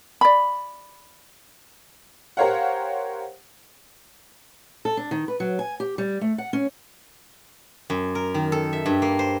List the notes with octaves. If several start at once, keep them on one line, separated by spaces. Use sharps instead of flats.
D5 B5
G4 A#4 C5 C#5 F5 F#5
A4
D4
D#3
B4
F#3
G#5
G4
G3
A3
F#5
C#4
F#2
A#4
D#3
A4
E5
G2
A#3
C5